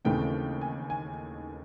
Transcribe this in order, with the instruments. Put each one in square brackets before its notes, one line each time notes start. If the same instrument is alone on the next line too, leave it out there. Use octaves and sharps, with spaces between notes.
[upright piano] D#2 C#3 E3 A3 C4 G5
G#5
G#5